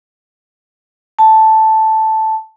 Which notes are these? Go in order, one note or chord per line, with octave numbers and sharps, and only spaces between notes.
A5